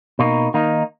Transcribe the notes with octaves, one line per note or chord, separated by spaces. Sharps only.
B2 A#3 D#4
D#3 A#3 D#4